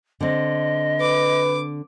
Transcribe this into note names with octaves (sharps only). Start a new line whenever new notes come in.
D3 C4 D#5
B4 D6